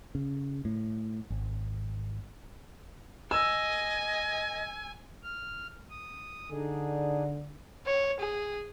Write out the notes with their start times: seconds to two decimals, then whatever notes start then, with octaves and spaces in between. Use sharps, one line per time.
0.15 C#3
0.65 A2
1.30 G#1
3.31 D#5 G#5 E6
5.23 F6
5.90 D#6
6.51 D3 D4 D#4 G#4
7.86 C#5
8.20 G#4